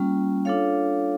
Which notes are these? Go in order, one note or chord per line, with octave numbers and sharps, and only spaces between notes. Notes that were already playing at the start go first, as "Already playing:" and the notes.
Already playing: G3 A#3 C#4 F4
D4 F4 A4 C#5 F5